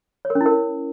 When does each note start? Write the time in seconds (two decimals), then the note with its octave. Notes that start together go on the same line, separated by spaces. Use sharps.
0.25 C#5
0.30 A#4
0.35 C#4
0.41 E4
0.46 A#4